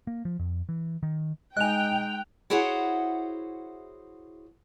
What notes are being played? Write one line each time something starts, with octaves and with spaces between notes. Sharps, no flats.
A#3
F3
F2
E3
D#3
G#3 D#4 D#5 G5 G#5 F#6 F7
E4 F#4 G#4 C5 C#5 F#5